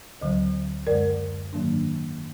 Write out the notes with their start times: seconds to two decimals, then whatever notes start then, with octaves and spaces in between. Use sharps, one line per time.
0.21 D2 D3 F#3
0.87 F#2 D3 G#3 A#4 D5
1.53 G#2 D#3 F#3 A#3 D4